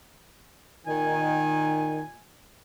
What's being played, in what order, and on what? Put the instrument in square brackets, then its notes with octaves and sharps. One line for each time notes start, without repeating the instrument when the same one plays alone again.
[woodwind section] A#2 G#5 [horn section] D#3